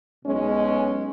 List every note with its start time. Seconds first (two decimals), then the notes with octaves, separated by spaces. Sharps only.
0.24 B1 B2 G#3 C#4